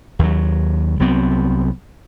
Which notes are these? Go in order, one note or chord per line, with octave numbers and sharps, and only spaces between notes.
D#2 F#3
C2 F#3 B3 C4